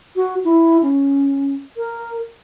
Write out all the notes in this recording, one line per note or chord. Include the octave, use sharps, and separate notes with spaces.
F#4
E4
C#4
A#4